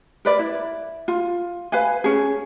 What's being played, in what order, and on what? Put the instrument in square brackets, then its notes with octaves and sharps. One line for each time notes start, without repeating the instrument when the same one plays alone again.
[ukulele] A#4 B4 D5
E4
F4
B4 F5 G#5
C#4 G#4